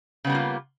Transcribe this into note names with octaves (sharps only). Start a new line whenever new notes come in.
C#3 G3 A#3 B3 F4